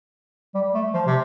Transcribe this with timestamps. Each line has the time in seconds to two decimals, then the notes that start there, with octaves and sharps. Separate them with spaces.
0.55 G3
0.74 A3
0.94 F3
1.07 C3